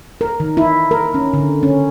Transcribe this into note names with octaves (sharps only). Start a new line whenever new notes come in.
A#4
D#3
E4
A#4
C#4
D3
C#4